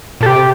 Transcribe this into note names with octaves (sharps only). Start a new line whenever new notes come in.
A#2 A4
C3 G4